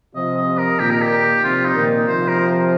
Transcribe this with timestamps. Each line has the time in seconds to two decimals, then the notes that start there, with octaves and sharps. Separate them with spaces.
0.16 C3 F3 D#5
0.37 D#5
0.58 A#4
0.79 A#2 D#3 G4
0.91 A#4
1.02 G4
1.43 C3 F3 F4
1.65 D#4
1.75 A#2 D#3
2.07 C3 F3 C5
2.28 A#4